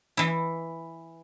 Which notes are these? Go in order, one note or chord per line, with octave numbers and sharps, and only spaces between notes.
E3 E4